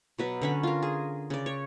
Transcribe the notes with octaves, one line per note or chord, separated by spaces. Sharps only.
B2 F#3 B4
D3 C#4 B5
F4 A#4
G#4
C#3 D5
C#5